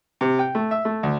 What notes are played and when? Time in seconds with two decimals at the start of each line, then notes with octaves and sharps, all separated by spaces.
0.21 C3
0.39 G5
0.55 A3
0.71 E5
0.85 A3
1.03 D2